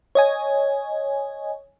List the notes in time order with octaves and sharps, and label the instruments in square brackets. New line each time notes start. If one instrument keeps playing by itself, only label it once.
[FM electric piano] C#5 D#5 G#5